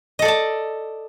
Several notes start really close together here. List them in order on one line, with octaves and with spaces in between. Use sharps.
D#5 A4 D5 A5